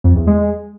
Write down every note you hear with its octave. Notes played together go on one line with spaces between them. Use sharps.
F2
E2
G#3